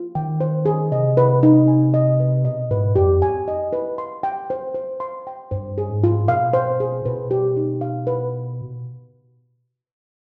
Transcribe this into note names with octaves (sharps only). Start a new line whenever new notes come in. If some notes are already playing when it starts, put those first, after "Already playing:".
Already playing: F4
D#3 G5
C5
G#4
C3 D#5
B4
D#4
G#5
D#5
B4
B2 D#5
G#2 B4
F2 G4
G#5
D#5
B4
C6
G5
C5
C5
C6
G5
G2 C5
G#4
G#2
F4
B2 F5
C5
G#4
B2 B4
G4
D#4
F5
B4